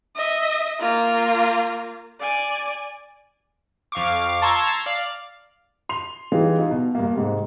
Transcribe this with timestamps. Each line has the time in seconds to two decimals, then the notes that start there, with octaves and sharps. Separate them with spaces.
0.16 D#5 E5
0.79 A#3 F4
2.21 D5 G#5
3.92 F2 F5 C#6 D6
4.42 A5 A#5 C6 C#6 E6 G#6
4.86 D5 F5
5.89 C6 F7
6.32 E3 G3 G#3 D#4 F4
6.58 D#4 F4
6.71 B2
6.95 G2 A#3
7.15 G#2 C3